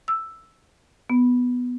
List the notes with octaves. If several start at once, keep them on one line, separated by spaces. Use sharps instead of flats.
E6
B3